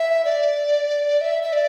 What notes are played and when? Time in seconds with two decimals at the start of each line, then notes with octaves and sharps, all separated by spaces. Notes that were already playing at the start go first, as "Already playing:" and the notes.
Already playing: E5
0.25 D5
1.21 E5
1.43 E5
1.53 D5